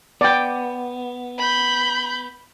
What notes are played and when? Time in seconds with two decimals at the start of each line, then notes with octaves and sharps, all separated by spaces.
0.21 B3 D5 G5
1.38 B5 G6